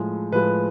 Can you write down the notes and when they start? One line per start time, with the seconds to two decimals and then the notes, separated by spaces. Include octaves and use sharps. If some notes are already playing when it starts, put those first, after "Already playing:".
Already playing: A2 F3 G#3
0.32 A2 F3 G#3 B4